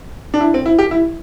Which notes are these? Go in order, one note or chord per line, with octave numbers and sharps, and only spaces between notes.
D4
E4
C4
E4
G4
E4